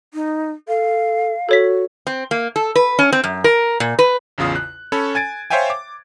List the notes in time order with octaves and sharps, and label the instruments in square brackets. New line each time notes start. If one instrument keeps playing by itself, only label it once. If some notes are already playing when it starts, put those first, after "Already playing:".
[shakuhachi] D#4
[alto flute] A4 [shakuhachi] F5
[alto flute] F#4 [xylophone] A4 C#5 B6
[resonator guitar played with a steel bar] C4
A#3
A4
B4
C#4
C4
F#2
A#4
A#2
B4
[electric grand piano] A1 E2 C#3 F4 D#6
F#6
C#4 A4 C#5 B5
G#5 G#6 A6 D7
C5 C#5 E5 F5 G5 G#5
D6